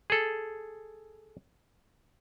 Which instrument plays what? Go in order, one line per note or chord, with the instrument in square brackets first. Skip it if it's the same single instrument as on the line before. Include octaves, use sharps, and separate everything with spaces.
[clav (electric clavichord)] G#4 A4